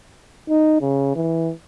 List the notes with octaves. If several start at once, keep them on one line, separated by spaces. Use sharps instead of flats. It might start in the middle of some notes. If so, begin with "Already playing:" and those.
D#4
C#3
E3